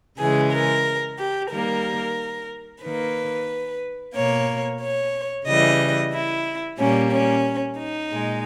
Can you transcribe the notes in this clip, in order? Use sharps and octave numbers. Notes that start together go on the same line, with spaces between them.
C#3 E3 G#3 G#4
A#4
G4
D#3 G3 A#3 A#4
D#3 A#3 B4
B2 A#3 C#5
C#5
C#3 E3 G3 D#5
E4
A#2 G3 A#3 C#4
C#4
D#4
A#2 G#3